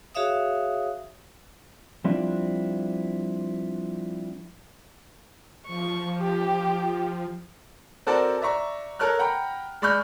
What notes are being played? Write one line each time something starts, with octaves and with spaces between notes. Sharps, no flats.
F#4 G#4 C#5 E5 F5 D#6
F3 G3 C4 D4 E4 F4
F3 C#6
G4
C4 F#4 A4 A#4 C5 D5
D5 E5 A#5 C#6
A4 A#4 C#5 F6 F#6
F#5 G5 A#5 B5
G#3 D5 B5 C#6 F6 G6